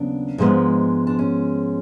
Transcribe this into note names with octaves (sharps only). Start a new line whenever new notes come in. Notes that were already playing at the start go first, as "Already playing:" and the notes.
Already playing: D#2 C#3 F#3 B3 D4
G#2 F3 G#3 B3
D4
C#4